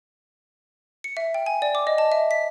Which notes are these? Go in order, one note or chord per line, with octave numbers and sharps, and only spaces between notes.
C#7
E5
G5
G#5
D5
D6
D#5
A5
E5
B6